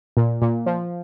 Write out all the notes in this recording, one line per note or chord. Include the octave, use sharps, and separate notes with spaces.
A#2
A#2
F3